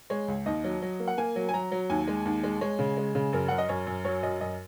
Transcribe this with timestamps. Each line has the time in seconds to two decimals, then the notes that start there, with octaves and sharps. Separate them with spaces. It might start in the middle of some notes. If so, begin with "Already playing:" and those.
0.10 G#3 C#5
0.28 C#2
0.46 D#2 D#5
0.64 F#3
0.82 F#3
1.00 A#3
1.08 F#5
1.18 A#3 G#5
1.36 F#3
1.49 G#5
1.54 F#3 A#5
1.71 F#3
1.90 D#2 G#5
2.08 G#3
2.25 D#2
2.43 G#3
2.61 G#3 C#5
2.79 C#3
2.97 G#3
3.15 C#3
3.33 F#2 A#4
3.48 F#2 F#5
3.58 D#5
3.69 F#2 C#5
3.87 F#2
4.05 F#3 C#5
4.23 F#2 D#5
4.41 F#2 D#5